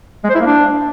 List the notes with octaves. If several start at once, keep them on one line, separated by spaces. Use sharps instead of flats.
G#3
C5
E4
A#3
D4